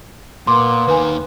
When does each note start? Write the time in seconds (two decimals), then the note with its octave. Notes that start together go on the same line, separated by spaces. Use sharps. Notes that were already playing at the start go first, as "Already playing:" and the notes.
0.47 A#2 A#3 B3 C6 D6
0.88 D#2 D#3 B4 G#5